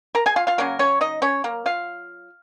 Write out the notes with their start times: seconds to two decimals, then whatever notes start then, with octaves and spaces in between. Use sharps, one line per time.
0.15 A#4 A#5
0.26 G#4 G#5
0.36 F4 F5
0.47 F4 F5
0.58 C#3 F#3 A#3 C#4 A#4
0.79 C#4 C#5
1.01 D#4 D#5
1.22 C#4 C#5
1.44 A#3 A#4
1.66 F4 F5